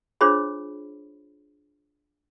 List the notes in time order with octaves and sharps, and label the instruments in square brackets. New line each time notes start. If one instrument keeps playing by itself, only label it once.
[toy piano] D4 F4 G#4 C5 C#5 B5